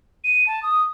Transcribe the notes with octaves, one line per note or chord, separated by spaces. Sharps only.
D#7
A5
D#6